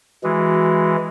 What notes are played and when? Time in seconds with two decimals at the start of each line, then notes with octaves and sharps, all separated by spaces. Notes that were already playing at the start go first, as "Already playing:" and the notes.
0.24 E3 G#3 F#4